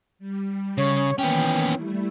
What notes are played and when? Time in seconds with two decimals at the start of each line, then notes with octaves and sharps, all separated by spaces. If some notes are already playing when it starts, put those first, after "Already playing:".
0.19 G3
0.78 C#3 C#5
1.19 D#3 E3 A#3 B3 C#4 G5
1.74 G3 A3 E4